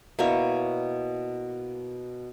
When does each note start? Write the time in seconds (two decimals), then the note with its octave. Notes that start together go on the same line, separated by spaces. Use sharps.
0.19 B2 A#3 E4 C#5